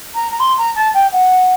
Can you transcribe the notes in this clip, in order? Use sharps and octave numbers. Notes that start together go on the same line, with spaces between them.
A#5
A#5
C6
A#5
A5
G5
F#5